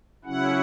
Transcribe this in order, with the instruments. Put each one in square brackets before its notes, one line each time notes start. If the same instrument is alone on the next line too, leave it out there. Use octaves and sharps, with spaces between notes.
[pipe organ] C#3 F#3 C#4 E4 F#5